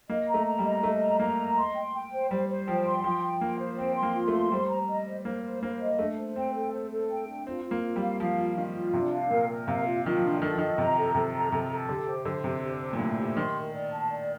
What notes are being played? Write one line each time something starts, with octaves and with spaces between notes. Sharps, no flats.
A#3 D#5
A#5
A3
A#5
G3
D#5
A3 D#5
A#5
A#3 A#5
D#5
C6
G5
G5
C5
G3 C5
C5
F3 G5
C6
F3 G5
G5
A#3 F4
C5
C4 G5
C6
A#3
F4
A3
C6
G3 C5
A#5
D#5
C5
A#3 C5
C5
A#3 C5
D#5
A3 D4
C5
C4 G5
A4
C5
A4
G5
D4
C4 F4
F4
A#3
F4
G3
F5
F3 F5
F4
D#3 F4
F4
C3 D4
F5
A#2 A#4
A#4
C3 F5
F4
D#3 F4
F3
D4
D#3 A4
F3
D#3 D#5
C3 A#5
A4
C3 A4
A#5
C3 A4
A4
D3 G4
C5
D3 C5
C3 G4
G4
C5
A#2
A2 C5
G4
D#3 C6
A#4
D5
A5
D5